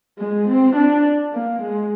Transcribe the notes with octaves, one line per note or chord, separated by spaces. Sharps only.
G#3
C4
D4
A#3
G#3